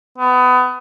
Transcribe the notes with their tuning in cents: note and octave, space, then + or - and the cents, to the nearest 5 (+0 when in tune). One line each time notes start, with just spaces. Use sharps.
B3 +25